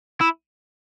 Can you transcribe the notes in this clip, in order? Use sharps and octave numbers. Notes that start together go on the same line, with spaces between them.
E4